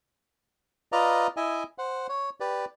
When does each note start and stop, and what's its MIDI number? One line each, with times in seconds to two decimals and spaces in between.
0.92 1.27 65
0.92 1.27 71
0.92 1.27 74
0.92 1.27 75
0.92 1.27 77
0.92 1.27 82
1.37 1.63 64
1.37 1.63 75
1.37 1.63 76
1.37 1.63 80
1.78 2.07 72
1.78 2.07 78
2.09 2.30 73
2.40 2.65 67
2.40 2.65 71
2.40 2.65 74